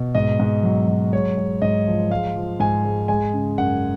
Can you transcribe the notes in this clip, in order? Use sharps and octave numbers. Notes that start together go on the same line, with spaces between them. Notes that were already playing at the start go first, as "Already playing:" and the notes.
Already playing: B2
G#2 D#5
G#2
F#3
F#3
G#3 C#5
G#3
G#2 D#5
F3
G#3 F5
F3
G#2 G#5
G#3
G#3 G#5
C#3
F#2 F#5